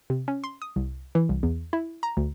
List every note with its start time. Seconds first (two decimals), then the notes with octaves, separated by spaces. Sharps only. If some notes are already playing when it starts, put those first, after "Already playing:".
0.10 C3
0.28 C#4
0.44 C6
0.62 D#6
0.76 C2
1.15 E3
1.29 C2
1.43 E2
1.73 E4
2.03 A#5
2.17 D2